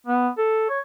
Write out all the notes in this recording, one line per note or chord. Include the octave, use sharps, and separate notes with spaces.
B3
A4
C#5